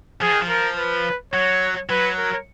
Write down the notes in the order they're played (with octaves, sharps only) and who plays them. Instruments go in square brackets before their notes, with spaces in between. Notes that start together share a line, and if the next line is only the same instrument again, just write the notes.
[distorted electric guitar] F3 [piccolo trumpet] G#4
[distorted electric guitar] D#3
F3
[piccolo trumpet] A#4
B4
[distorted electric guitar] F#3 [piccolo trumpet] C#5
[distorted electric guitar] F#3 [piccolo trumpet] B4
[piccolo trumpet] A#4